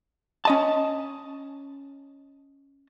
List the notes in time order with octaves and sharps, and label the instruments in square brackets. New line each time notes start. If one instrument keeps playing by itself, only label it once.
[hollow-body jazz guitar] C#4 D#5 A5